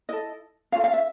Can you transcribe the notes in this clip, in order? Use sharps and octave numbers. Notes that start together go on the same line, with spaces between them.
E4 A4 D#5
C#4 F4 A4 F5
F5
E5